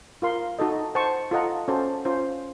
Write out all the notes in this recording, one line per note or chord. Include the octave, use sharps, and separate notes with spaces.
F4 A#4 F5 C6
D#4 F#4 A4 D#5
C5 F#5 A5 C#6
F4 A4 D#5 F#5 A#5
C#4 F#4 A4 C5
C#4 F4 C5